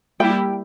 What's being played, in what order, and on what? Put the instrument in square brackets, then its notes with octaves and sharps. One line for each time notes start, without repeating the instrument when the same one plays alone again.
[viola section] G3 A#3 E4 G4 [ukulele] G5